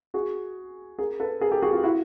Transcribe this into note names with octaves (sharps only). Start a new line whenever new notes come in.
F#4 G#4
G#4 A#4
A4 B4
G#4 A#4
G4 A4
F#4 G#4
F4 G4
E4 F#4